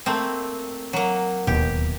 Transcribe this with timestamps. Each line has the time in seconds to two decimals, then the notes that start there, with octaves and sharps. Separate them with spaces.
0.06 A3 A#3 C4
0.93 F#3 A#3
1.47 D1 D#2 B2 G4